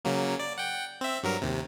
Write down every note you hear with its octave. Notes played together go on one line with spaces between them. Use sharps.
C#3 F#3 A#3
D5
F#5 G5
C4 E5
G2 F#3 A#4
D#2 C3